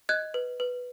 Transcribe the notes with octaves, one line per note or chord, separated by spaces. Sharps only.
D#5 F#6 G#6
B4
B4